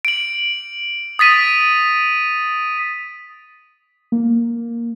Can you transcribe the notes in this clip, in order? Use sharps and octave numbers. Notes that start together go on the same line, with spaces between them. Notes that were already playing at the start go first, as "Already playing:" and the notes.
D7 F#7
D#6 A6 B6 D#7
A#3